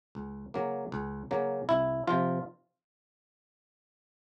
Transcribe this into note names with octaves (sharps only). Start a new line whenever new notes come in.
C#2
C#3 F#3 A#3
C#2
C#3 F#3 A#3
C2 E4
C3 F3 F4